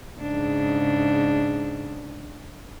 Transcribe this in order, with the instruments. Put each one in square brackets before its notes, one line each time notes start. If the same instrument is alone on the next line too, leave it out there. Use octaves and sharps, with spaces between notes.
[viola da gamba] G#2 C#3 D4